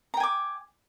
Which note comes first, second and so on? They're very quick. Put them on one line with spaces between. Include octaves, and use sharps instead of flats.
A#5 G5 G#5 D6